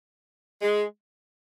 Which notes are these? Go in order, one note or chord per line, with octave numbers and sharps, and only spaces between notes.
G#3